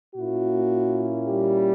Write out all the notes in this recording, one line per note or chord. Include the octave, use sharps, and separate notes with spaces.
A#2 A#3 C#4 E4 F#4
G3 G4